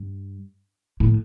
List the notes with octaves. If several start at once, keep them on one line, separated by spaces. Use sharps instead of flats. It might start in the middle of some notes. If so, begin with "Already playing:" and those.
Already playing: G2
A2